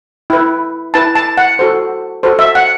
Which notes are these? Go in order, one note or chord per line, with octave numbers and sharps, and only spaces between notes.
E4 B4
E4 B4 A5
A5
F#5
F#4 A4 C5
F#4 A4 C5
E5
F#5